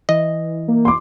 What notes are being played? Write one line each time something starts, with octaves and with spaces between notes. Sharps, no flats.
E3 D#5
A#3
C6 D6